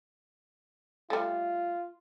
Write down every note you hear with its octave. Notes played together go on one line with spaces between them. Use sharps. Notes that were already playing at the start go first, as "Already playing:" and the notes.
G3 A3 F4